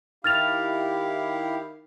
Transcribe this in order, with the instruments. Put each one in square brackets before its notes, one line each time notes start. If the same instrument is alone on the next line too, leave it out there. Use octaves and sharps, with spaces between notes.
[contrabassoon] D#3 [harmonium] E4 G4 F5 [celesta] F6 A6 F7